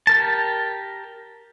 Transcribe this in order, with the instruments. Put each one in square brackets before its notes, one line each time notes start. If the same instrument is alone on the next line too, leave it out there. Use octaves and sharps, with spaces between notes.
[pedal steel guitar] G4 A#4 A5